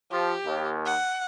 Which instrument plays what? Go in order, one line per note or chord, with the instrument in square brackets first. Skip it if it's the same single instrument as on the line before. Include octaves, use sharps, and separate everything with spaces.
[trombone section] F3 [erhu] G4
[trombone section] D#2
[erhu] F#5